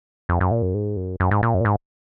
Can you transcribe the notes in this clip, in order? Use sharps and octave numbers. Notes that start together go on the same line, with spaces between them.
F2
F#2
A#2
F#2
G#2
F#2
F#2
G#2
A#2
F#2
A#2
G#2